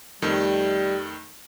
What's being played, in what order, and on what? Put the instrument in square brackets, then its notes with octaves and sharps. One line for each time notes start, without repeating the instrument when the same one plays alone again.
[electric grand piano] F2 D#3 A3 [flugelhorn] G3